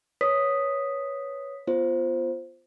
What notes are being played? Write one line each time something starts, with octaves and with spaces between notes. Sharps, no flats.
B4 C#5 D#6 B6
B3 F4 C5